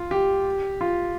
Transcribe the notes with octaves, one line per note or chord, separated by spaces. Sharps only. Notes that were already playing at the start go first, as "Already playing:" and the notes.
Already playing: F4
G4
F4